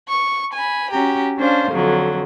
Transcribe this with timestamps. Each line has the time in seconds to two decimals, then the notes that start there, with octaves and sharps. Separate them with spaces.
0.11 C#6
0.53 G#5 B5
0.91 C#4 F#4 G4 A#5
1.37 C#4 D4 C5 F5
1.71 F2 D3 F#3